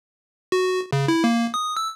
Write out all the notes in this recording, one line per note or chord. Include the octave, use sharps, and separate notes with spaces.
F#4
C#3
E4
A#3
D#6
E6